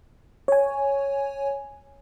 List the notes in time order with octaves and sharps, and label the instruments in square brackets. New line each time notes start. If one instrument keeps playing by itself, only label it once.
[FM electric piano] C#5 G#5